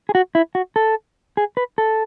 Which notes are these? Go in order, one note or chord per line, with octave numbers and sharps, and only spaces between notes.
G#4
F#4
E4
F#4
A4
G#4
B4
A4